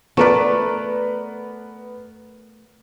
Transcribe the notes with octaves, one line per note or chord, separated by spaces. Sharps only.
A3 B3 A#4 B4 D5